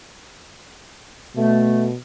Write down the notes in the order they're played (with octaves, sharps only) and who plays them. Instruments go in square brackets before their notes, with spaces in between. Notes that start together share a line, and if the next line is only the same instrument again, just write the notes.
[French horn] B2 [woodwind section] A3